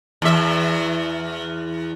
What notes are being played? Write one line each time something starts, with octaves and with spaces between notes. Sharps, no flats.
E2 E5